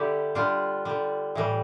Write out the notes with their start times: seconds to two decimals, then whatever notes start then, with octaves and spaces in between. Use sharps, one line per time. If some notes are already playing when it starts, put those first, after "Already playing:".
Already playing: D3 G3 E4 G4 A4
0.35 D3 G3 D4 F4
0.85 D3 G3
1.35 A2 E3 G3